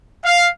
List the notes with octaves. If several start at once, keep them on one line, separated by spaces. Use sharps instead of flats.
F5